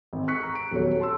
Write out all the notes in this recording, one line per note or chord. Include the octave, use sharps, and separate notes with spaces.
G#1
C#6 F#6 B6 C#7
A#5
D7
D#1 E2 F#3 A4 C#5
A5 C6 E6